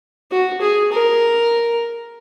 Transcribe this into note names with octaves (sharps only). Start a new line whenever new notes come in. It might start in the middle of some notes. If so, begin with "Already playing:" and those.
F#4
G#4
A#4